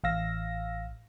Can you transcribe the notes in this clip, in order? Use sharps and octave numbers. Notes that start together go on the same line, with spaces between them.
A1 F5 E6 A#6